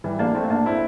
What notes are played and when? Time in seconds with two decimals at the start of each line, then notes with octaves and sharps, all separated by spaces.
0.04 E3 G3
0.19 A#3 D4
0.35 A3 C4
0.50 A#3 D4
0.66 C4 E4